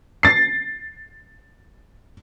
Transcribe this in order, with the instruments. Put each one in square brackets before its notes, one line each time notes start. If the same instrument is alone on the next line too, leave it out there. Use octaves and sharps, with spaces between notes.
[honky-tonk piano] A6 C7